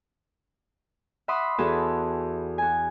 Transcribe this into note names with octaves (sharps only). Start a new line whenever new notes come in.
E5 F#5 B5 C6 D6 D#6
E2 F#4 G#4 A4 E5 A5
F#4 G#5